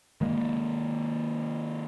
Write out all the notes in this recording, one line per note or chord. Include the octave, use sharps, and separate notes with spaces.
D#3 G#3 A#3